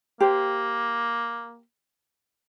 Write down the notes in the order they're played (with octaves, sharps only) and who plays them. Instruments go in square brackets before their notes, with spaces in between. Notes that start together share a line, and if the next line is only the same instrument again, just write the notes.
[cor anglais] A#3 [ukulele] G4 C5